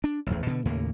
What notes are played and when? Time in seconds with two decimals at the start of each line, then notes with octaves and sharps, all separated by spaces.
0.04 D4
0.26 A1 E2
0.47 B2 D3
0.66 D#2 A2 C#3 A#3